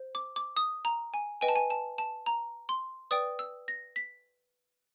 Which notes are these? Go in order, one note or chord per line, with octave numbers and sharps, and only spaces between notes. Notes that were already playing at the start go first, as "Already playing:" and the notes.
Already playing: C5
D6
D6
D#6
A#5
G#5
B4 D#5 G5 G#5
A5
G#5
A5
A5
A#5
C6
B4 D5 G5 D#6
E6
A#6
B6